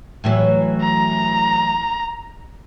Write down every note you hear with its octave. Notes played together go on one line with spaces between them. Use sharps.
A2 E3 F#3
A#5